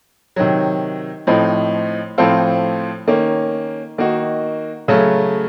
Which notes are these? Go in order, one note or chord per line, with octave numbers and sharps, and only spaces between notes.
C3 D#3 F#3
A2 F3 C4 D#4
A2 F3 C4 F4 A4
D#3 A#3 C#4
D#3 A#3 D#4 F#4
C#3 F#3 A3